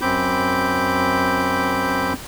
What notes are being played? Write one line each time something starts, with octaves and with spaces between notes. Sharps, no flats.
F#2 C4 B5 D6 G6